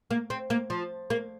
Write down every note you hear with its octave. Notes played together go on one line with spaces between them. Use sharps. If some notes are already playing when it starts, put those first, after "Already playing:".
A#3
C4
A#3
F3
A#3